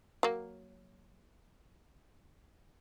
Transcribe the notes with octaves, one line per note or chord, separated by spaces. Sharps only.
F#3 A#3